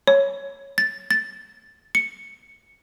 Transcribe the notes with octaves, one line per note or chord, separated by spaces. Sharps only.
C#5
A6
A6
C#7